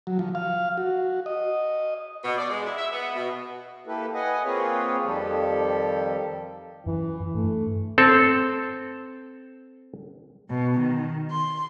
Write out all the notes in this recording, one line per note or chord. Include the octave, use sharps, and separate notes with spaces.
F#3
F3
F5
F#4
D#5
B2
D5
G#3
E4
E5
B3
B2
A#3 E4 G4 A4 B4
B4 D#5 F#5 G#5
A#3 C4 F4 G#4 B4 C#5
F2 D#3 F3 G3 G4 A4
F#2 E3
G2 A3
C4 A4
B2
D#3
C6